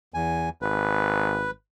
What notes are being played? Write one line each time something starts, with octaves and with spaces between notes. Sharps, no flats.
E2 G#5
G#1 B4